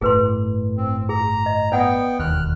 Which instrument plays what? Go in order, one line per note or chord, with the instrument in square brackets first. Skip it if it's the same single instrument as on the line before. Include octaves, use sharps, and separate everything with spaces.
[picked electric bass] G1 A2 [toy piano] G#4 B4 C6
[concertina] C4
[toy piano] G#4 [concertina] A#5
[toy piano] D#5
[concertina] B3 G5 [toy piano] D5 F#5 D#6
[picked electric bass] E1 D#2 [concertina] F6 F#6